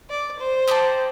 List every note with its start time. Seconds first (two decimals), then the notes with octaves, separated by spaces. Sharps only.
0.10 D5
0.39 C5
0.67 D#4 G4 D5 A5